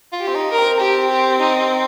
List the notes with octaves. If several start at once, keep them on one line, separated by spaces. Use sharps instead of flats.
F4
G4
C4
D#4
A#4
C4
G4
G4
D#4